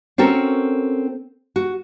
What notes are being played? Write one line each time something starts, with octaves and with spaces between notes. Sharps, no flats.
C4 C#4 F#4 A4 A#4
F#4